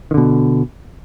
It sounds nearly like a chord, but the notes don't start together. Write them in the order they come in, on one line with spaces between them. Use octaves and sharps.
D#3 D3 B2